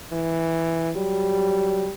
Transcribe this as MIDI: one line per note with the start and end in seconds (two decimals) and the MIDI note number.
0.12 0.91 52
0.96 1.86 54
0.96 1.94 55